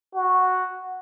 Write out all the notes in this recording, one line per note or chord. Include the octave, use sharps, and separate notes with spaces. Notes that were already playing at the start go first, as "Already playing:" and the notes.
F#4